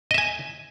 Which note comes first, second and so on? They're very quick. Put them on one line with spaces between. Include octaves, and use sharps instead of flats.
D#5 E5 G#5